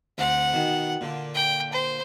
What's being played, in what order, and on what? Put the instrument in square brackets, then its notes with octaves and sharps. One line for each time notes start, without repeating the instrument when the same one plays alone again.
[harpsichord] D2 C4 [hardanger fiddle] F#5
[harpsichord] B2 D#3
A#2 D3
[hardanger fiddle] G5
C5